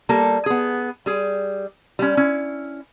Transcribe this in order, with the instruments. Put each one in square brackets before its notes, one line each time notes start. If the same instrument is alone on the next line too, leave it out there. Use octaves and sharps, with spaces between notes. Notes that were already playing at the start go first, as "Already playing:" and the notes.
[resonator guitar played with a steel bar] G3 A#3 A4 A5
B3 G#4
G3 G#4
G3 C#4
C#4 E4